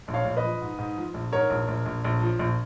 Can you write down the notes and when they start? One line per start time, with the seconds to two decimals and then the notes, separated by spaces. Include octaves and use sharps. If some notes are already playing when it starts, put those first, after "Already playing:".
0.08 A#1
0.14 C#5 F5
0.25 A#1
0.37 B4 D#5
0.44 F3
0.62 G#2
0.78 G#2
0.97 F3
1.14 A#1
1.32 G#2 A#4 C#5
1.50 A#1
1.68 A#1
1.86 A#1
2.05 A#1
2.22 F3
2.39 A#1